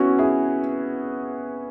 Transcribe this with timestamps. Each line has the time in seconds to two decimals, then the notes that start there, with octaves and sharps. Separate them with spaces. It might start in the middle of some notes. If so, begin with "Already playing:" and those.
Already playing: B3 C#4 E4 F#4
0.19 E4 G#4